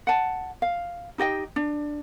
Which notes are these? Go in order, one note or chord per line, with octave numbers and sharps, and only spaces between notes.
F#5 A5
F5
D#4 G4 D#5 G5
D4